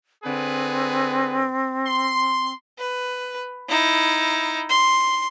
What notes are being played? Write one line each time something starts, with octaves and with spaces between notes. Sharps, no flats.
D3 C4 G#4 B4
C6
B4
D#4 E4
C6